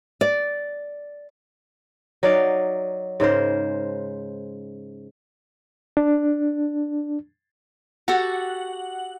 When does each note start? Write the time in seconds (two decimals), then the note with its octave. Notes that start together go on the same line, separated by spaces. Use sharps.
0.21 D5
2.23 F#3 D#4 D5 F5
3.20 G#2 C#3 A#4 C5
5.97 D4
8.08 F#4 G4 A4 F#5